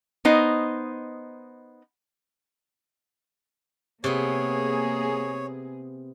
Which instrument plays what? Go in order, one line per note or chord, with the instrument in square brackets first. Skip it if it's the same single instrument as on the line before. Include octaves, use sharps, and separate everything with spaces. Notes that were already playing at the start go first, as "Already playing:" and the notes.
[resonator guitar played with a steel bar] B3 D#4 C5 D#5
[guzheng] C3 B3 [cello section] A#3 G#4 [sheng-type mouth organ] C#5